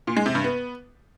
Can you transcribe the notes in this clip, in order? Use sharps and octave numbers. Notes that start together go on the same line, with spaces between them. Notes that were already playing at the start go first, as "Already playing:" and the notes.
A#2
G#3
C3
G2
B3